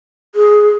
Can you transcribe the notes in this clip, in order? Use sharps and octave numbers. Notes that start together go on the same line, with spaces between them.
G#4